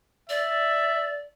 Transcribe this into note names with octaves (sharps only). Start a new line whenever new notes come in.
D5 E5